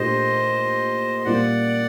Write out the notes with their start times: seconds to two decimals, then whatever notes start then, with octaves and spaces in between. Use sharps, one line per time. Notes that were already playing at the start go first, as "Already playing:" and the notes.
Already playing: A#2 A3 D4 G4 C5 D#5
1.20 D#5
1.25 A#2 G3 A#3 D5 F#5